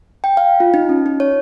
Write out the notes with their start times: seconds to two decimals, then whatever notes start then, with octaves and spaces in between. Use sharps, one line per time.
0.24 G5
0.37 F5
0.60 F4
0.74 D#4
0.89 C#4
1.06 D#4
1.20 C#5